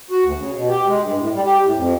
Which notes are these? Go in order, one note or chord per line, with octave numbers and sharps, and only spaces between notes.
F#4
D2
C#3
B2
G4
G#3
G2
A2
G3
G4
A2
F2